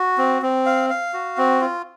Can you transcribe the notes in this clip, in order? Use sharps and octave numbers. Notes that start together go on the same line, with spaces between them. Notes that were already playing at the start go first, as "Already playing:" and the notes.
Already playing: F#4
C4
C4
F5
F5
F#4
C4
F4